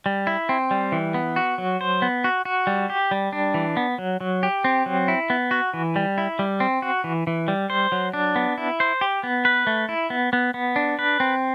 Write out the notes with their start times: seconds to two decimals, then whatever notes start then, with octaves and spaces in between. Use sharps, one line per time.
0.06 G3
0.27 E4
0.49 C4
0.71 G3
0.92 E3
1.14 B3
1.36 F#4
1.58 F#3
1.81 C5
2.02 B3
2.24 F#4
2.45 F#4
2.67 G3
2.90 G4
3.11 G3
3.33 D4
3.54 E3
3.77 B3
3.98 F#3
4.21 F#3
4.43 G4
4.64 C4
4.86 F#3
5.08 E4
5.30 B3
5.51 F#4
5.74 E3
5.96 G3
6.18 E4
6.39 G3
6.60 C4
6.82 F#4
7.04 E3
7.27 E3
7.48 G3
7.70 C5
7.92 F#3
8.13 D4
8.36 B3
8.58 E4
8.80 C5
9.01 G4
9.23 B3
9.45 B4
9.67 A3
9.89 E4
10.10 B3
10.33 B3
10.54 B3
10.76 D4
10.99 B4
11.20 C4